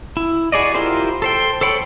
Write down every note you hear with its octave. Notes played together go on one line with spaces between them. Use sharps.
E4
F#4 G#4 D5 D#5
E4 F4 G4 A#4 C5
A4 C5 G5
A4 C5 C#5 G5 B5